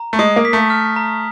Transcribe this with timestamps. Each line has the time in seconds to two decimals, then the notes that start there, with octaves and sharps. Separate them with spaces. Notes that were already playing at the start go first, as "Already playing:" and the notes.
Already playing: A#5
0.13 A3
0.19 G#3 D#6
0.36 A#3
0.45 B6
0.53 A3
0.70 F6
0.96 A#5